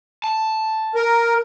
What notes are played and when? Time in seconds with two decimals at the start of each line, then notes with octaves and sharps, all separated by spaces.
0.24 A5
0.95 A#4